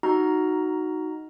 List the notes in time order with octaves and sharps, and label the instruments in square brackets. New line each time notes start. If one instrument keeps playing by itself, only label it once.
[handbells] D#4 F#4 A#5 F6